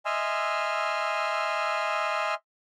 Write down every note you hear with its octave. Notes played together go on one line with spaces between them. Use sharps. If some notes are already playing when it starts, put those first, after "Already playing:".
D#5 E5 G#5 C6 E6 F6